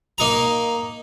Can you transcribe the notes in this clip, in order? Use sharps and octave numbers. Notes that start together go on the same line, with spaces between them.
A#3 D#4 A#5